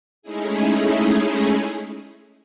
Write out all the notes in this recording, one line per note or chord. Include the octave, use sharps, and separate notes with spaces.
G#3 A3 C#4 D#4 E4 G#4